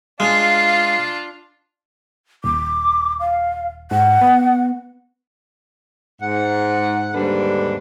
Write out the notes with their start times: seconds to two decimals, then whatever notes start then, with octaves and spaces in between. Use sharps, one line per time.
0.20 G#3 D4 F4 F5
2.44 D#1 D6
3.20 F5
3.91 G#2 F#5
4.21 B3
6.22 G#2 F#5
7.14 D#2 G#2 D3 G3 D4 B4